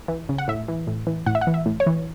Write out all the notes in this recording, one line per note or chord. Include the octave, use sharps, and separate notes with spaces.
E3
C#3
F#5
A2 E5
E3
A2
E3
A2 F#5
E5
F#5
E3
E5
A2
C#5
E3